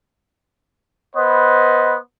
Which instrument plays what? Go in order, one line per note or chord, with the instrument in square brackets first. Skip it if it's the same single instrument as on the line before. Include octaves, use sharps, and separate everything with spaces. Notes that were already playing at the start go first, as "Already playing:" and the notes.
[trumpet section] B3 B4 C5 D#5